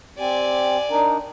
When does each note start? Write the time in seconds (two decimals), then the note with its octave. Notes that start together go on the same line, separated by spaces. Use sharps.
0.18 C4 G4 D5 G#5
0.91 D4 D#4 A#4